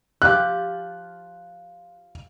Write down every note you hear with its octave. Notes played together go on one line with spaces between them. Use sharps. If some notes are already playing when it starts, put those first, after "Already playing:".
F3 F4 G4 F#6